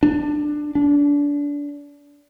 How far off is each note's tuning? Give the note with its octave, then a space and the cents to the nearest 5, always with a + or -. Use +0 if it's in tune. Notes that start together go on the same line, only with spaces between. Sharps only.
D4 +15
D4 -25